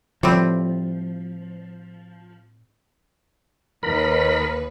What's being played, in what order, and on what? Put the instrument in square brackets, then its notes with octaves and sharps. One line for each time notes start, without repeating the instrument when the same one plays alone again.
[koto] A2 G3 C4 [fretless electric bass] F3
[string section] D#2 B4 [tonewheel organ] A#4 B5